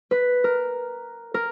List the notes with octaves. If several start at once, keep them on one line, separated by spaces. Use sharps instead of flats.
B4
A#4
A#4